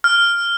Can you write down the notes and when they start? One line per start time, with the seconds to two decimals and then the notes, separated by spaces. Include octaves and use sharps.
0.04 F6